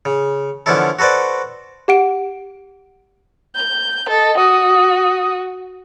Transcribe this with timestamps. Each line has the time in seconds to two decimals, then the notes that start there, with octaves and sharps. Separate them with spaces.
0.05 C#3
0.66 D3 F3 B3 C#4 E4 A4
0.99 F#4 A4 B4 C5 D5
1.88 G4 F#5 D7
3.55 G6
4.09 A4 D#5
4.38 F#4 D#6